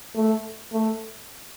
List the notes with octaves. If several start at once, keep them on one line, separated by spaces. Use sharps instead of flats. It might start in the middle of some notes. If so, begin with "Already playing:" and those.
A3
A3